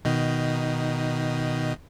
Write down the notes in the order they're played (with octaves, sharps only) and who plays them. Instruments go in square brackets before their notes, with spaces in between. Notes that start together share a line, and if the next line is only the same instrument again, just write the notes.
[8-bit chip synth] B2 D#3 D#4